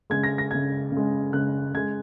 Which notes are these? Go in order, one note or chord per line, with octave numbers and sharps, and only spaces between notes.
C#3 G#3 G#6
A#6
A#6
C#3 G#3 G#6
C#3 G#3
C#3 G#3 F#6
C#3 G#3 G#6